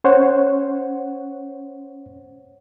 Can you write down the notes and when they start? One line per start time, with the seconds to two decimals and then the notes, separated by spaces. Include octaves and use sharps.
0.04 C#4 C5 C#5 F#5